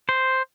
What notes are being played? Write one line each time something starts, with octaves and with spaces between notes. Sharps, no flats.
C5